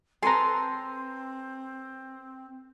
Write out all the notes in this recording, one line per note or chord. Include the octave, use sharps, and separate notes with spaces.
C4 A4 B4 G#5 A#5 C6